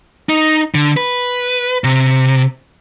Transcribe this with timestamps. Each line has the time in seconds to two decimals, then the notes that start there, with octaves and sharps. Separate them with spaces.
0.29 D#4
0.74 D3
0.97 B4
1.84 C3